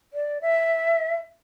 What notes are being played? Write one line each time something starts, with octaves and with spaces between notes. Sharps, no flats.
D5
E5